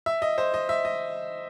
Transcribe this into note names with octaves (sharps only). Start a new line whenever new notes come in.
E5
D#5
C5
D#5
E5
D#5